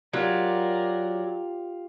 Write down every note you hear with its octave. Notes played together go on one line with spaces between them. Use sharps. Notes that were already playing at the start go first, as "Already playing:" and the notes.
F#3 F4 G4 A#4 D5